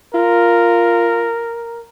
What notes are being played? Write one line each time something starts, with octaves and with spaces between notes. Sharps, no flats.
F4 A#4